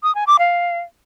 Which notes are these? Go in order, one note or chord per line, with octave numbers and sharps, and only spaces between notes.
D#6
G#5
D6
F5